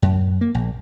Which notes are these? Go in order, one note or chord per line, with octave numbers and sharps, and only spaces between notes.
F#2
A#3
A#1